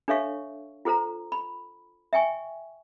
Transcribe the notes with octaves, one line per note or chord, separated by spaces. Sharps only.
D4 A4 C#5 E5 F5 C#6
F4 A4 C5 A#5
B5
E5 G5 G#5 C#6